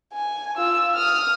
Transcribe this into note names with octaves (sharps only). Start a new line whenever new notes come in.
G#5
F4 E6
D#6 F6